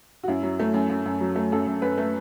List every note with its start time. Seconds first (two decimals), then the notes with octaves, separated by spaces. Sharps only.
0.23 F#4
0.28 F#2 E4
0.43 F#3
0.59 A3
0.74 F#2
0.89 F#2
1.05 F#2
1.20 F#3
1.36 A3
1.52 F#2 A4
1.67 F#2
1.82 F#2 B4
1.97 A3